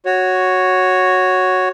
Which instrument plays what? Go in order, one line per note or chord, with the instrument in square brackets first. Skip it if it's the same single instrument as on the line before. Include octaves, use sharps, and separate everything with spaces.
[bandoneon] F#4 C#5